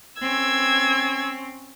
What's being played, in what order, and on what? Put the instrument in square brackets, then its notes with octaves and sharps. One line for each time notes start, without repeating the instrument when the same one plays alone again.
[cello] C4 C#4 [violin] E6 G#6